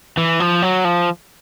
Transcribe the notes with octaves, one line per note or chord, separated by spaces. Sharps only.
E3
F3
F#3
F3